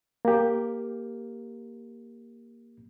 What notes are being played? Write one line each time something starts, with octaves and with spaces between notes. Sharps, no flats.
A#3 G4